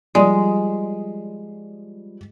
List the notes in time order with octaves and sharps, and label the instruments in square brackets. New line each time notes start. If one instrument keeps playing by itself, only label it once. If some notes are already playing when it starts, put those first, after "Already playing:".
[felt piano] F3 G3 [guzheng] G#3 [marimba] D5 D#6